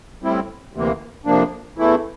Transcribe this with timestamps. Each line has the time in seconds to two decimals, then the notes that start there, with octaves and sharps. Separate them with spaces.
0.22 A2 G3 C4 E4
0.74 D2 C3 E3 A#3
1.25 F2 C3 F3 A#3 D4
1.77 E2 E3 A3 E4